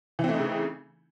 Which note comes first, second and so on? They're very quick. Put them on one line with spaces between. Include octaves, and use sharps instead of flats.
E3 C4 A3 D#4 C#3